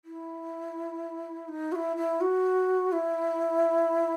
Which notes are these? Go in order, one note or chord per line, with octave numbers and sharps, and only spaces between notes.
E4
D#4
F#4
E4
E4
F#4
E4